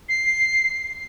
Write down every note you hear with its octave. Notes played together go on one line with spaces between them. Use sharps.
C7